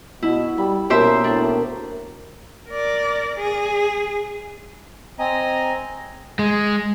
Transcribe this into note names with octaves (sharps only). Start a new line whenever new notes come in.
B2 E4
G3 B5
B2 A#3 C#4 G4 C5 E5
A2 D4
A#4 D5
G#4
C4 D#5 G#5 A#5
G#3